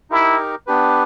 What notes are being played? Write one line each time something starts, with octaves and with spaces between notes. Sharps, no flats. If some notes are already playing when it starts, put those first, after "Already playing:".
D#4 E4 G4 A#4
B3 D4 G4 B4